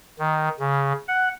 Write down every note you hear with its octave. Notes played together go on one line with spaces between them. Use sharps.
D#3
C#3
F#5